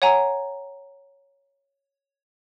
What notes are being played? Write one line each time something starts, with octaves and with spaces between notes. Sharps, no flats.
C#5 F#5 G#5 A#5